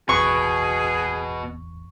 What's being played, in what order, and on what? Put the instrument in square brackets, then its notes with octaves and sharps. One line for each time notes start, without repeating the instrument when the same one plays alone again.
[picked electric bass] D1 G#1 E2 [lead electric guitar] B2 B3 [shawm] G#4 [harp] C#6